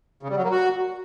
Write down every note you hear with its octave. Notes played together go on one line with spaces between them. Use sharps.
C#3
G3
F#3
A#3
F#4